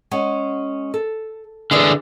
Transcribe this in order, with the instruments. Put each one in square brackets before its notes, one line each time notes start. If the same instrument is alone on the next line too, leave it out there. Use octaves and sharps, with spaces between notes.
[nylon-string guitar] G#3 C#4 F#5
A4
[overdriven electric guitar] D3 G#4 [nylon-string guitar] E3 B4 D5